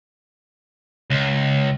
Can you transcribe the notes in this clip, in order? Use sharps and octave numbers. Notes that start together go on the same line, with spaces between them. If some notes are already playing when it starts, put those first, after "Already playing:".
C#2